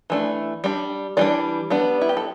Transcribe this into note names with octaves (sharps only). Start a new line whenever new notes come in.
E3 A3 D4
G3 D4
E3 G3 D4 D5
G3 B3 D4
E4
G4
A4